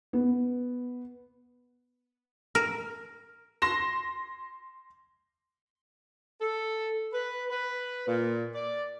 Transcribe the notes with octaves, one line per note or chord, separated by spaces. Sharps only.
B3
A#4
C6 A#6 E7
A4
B4
B4
A#2
D5